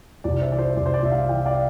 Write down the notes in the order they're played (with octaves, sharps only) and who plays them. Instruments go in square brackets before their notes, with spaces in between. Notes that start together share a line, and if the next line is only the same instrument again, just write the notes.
[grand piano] C2 D5
C5 E5
E3 D5
C5
C5
C2 D5
C5
D5
C2 E5
D5 F5
E3 E5 G5
D5 F5